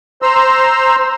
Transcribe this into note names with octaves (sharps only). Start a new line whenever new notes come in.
C5 A#5 C6 E6